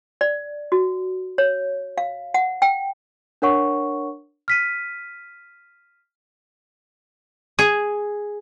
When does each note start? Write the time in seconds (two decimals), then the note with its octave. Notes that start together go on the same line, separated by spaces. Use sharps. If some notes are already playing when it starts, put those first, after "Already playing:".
0.21 D5
0.72 F#4
1.38 C#5
1.98 F5
2.34 F#5
2.62 G5
3.42 D4 A#4 C#5 F#5 C#6
4.48 F6 B6 D#7
7.59 G#4